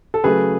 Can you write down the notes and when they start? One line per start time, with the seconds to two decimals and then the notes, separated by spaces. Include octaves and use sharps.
0.14 A4
0.24 C#3 F#3 A3 G#4 B4